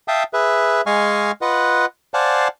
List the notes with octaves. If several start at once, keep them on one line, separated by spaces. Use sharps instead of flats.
E5 F5 G5 A5 D#6
G#4 B4 E5
G#3 D#5 F5 G#5 C#6 F6
F4 B4 D#5 F#5
C5 D5 F5 F#5 G#5 A5